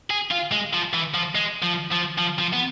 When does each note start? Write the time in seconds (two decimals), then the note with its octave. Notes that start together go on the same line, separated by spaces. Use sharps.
0.10 G#4
0.32 F4
0.52 G#3
0.73 F3
0.94 E3
1.14 F3
1.35 G#3
1.62 F3
1.91 F3
2.18 F3
2.39 F3
2.53 B3